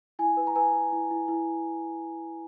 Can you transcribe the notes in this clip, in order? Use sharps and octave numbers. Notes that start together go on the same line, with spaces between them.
E4 G#5
B4
A#5
B4 G#5
B4
E4
E4
E4